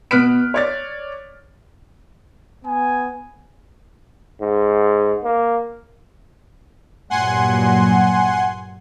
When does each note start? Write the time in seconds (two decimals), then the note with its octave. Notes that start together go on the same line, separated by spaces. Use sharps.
0.11 B2 B3 F6 F#6 B6 D7
0.54 C#5 D5 A6
2.64 B3 G#5
4.41 G#2
5.24 A#3
7.10 G2 A#2 F#3 F#5 G#5 C6